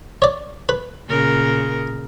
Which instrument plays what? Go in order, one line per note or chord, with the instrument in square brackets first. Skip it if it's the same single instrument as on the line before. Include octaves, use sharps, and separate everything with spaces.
[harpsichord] C#5 D5
B4
[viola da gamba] A#2 C#3 A#4